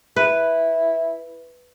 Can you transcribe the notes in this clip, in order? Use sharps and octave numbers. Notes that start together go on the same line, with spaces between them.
E4 B4